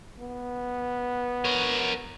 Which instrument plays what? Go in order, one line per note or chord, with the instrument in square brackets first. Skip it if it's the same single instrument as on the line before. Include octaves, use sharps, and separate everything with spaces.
[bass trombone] B3
[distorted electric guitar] A#4 C#5